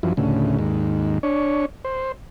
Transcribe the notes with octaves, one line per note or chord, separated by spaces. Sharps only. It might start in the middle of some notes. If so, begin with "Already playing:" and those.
F#2 E3 F3
D2 A2 C#3
D#2 G#2
D4 C#5
C5